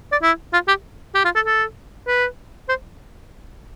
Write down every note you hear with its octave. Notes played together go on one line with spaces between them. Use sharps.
D5
E4
F4
G4
G4
F4
A4
A4
B4
C5